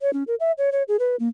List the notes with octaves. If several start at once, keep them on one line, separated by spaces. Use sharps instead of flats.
C#5
C#4
A#4
E5
C#5
C#5
G#4
B4
A#3